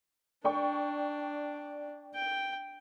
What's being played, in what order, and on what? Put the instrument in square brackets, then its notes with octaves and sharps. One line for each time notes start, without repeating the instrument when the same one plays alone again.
[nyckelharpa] D4 [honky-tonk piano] D5 G5 C#6
[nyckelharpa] G5